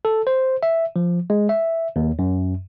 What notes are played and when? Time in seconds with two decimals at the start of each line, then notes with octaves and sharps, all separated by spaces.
0.05 A4
0.27 C5
0.63 E5
0.96 F3
1.30 G#3
1.49 E5
1.96 D#2
2.19 F#2